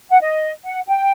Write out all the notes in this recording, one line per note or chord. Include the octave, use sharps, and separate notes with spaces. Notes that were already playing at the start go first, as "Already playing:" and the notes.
F#5
D#5
F#5
G5